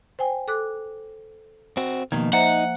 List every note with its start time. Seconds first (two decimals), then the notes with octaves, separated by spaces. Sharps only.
0.19 C5 G5 G#5
0.48 A4 D6 F#6
1.77 C4 F#4
2.12 B2 D#3 F3 A#3
2.33 D#4 C5 E5 F#5 A#5